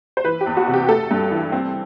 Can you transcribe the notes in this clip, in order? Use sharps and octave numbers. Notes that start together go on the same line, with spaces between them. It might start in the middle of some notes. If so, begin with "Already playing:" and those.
C5
E3 B4
G4
E2
F#4
C3
G4
A3 A4
G2
E3
C4